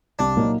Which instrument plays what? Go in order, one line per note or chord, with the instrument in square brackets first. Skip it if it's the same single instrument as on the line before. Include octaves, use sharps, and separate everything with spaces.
[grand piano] C2 [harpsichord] D4
[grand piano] A#2 F#3 A#3 D#4